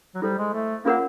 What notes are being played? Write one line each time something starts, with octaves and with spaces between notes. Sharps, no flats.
F#3
G3 E4 A4 C5
G#3
A3
A#3 C#4 F4 A#4 C#5 F#5